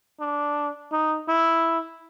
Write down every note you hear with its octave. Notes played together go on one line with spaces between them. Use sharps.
D4
D#4
E4